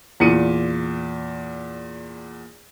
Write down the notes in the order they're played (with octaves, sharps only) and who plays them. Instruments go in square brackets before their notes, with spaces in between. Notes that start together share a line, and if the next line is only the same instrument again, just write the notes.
[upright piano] E2 A#2 C#7 D#7